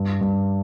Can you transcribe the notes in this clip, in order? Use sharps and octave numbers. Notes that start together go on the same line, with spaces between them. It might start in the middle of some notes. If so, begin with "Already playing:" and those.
Already playing: G2
G2